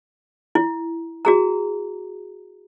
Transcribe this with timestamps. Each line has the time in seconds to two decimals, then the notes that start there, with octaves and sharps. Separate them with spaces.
0.55 E4
1.25 F#4 G#4 A#5